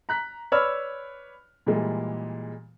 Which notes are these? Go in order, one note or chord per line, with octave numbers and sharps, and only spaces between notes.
A#5 F#6 B6
B4 C#5 D5 B5 E6 F6
A#2 E3 G3 G#3